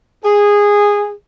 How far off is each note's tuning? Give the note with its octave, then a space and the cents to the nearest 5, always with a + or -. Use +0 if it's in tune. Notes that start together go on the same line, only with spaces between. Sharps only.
G#4 -15